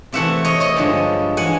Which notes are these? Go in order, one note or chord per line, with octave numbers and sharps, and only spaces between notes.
C3 E3 A3 E5 F#5
C#5 D#5
C#5 D#5
G2 D3 F3 G#3
E3 G#3 F#5 G#5